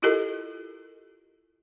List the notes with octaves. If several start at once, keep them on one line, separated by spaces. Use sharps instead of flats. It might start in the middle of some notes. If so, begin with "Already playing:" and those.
E4 F4 G4 A4 A#4 D#5